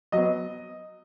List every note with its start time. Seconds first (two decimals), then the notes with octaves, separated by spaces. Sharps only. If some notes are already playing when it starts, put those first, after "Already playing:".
0.12 F#3 B3 D#5